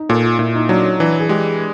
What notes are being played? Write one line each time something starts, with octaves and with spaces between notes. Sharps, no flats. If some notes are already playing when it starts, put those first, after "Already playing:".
Already playing: D#4
A#2 A4
F4
A#2 E4
D#4
F#3 D4
C#4
E3 D4
G#4
G#3 G4